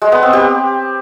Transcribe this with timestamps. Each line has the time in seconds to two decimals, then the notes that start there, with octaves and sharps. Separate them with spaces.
0.02 G#3
0.12 B3
0.23 C4
0.33 G4